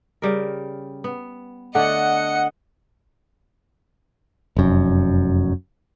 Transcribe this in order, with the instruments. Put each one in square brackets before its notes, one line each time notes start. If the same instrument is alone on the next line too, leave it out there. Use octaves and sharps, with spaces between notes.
[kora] C#3 G3 A#4
B3
[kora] D3 A3 D4 [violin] D#5 C#7 [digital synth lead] F#5
[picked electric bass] F1 F#2